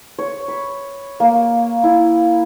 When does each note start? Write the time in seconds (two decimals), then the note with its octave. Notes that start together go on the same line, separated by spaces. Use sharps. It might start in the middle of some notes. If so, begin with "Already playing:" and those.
0.19 C#5
0.48 B5
1.20 A#3
1.84 E4